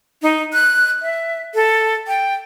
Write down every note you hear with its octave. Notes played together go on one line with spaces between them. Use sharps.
D#4
F#6
E5
A4
G5